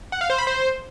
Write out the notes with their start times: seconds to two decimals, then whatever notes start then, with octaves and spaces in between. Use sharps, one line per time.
0.12 F#5
0.21 F5
0.30 C5
0.38 B5
0.47 C5